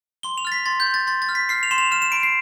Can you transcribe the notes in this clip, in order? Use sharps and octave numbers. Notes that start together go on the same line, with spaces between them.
C6 G7
F7
F6 A6
B6
C6 A6
G6
C6
A6
C6 A6
A6
F6
B6
F6 C7
F7
C6 E7
F7
F6 E7
E7
B5 D7
C7